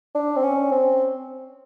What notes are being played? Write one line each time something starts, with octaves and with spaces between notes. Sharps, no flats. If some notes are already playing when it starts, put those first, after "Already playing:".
D4
C4
C#4
C4